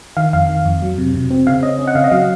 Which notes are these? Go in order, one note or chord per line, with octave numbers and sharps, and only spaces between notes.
D#3 F5
F2 F5
D#3
F2
F#3
C3
C3
C4
C#3 F5
C#4 D#5
C#4
F#5
C#3 F5
D#5
F#3 F5